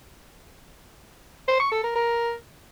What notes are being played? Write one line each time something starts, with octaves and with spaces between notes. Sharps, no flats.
C5
C#6
A4
A#4
A#4